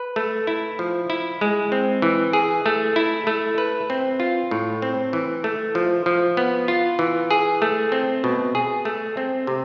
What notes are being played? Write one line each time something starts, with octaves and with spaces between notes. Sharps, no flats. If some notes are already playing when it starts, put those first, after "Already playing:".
Already playing: B4
A3
E4
F3
E4
G#3
C4
E3
G#4
A3
E4
A3
B4
C4
F4
A2
C4
E3
A3
F3
F3
B3
F4
E3
G#4
A3
C4
B2
G#4
A3
C4
C3